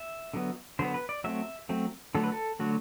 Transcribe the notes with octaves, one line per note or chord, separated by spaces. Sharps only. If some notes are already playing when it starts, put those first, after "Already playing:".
Already playing: E5
D3 F#3 B3
D3 F#3 B3 C5
B4
D5
F#3 A3 C4 E5
F#3 A3 C4
D3 F#3 A3 A4
B4
A4
D3 F#3 A3 F#4